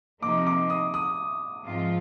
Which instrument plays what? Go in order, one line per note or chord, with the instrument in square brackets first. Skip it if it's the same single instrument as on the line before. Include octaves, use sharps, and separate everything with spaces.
[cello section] C3 F3 A#3 D#4 [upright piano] D6
[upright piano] D6
D#6
D#6
[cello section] G#2 F3 C4 F4